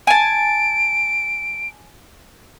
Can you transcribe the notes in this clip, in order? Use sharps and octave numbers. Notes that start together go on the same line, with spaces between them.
G#5 A5 D7